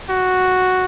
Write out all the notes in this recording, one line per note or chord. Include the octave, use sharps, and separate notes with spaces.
F#4